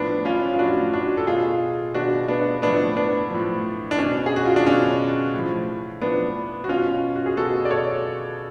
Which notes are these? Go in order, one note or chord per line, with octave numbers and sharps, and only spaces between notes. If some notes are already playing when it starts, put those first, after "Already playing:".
Already playing: A2 F3 B3 D4
C#4 F4
F4
A2 F3 D4 F#4
D4 F#4
A4
B2 F4 G#4
B2 D4 F#4
B3 D4
A2 F3 B3 D4
B3 D4
A2 F3
D4
B2 C#4
G#4
F#4
F4
D4
B2 C#4
A2 F3
A2 F3 B3 D4
F#4
B2 C#4 F4
F#4
G#4
B2 F#4 A4
D5
A4 C#5